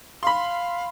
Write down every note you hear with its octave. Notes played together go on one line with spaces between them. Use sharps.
F5 B5 C6